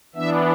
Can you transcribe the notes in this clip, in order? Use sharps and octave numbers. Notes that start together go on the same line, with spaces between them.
E3 B3 D4 E5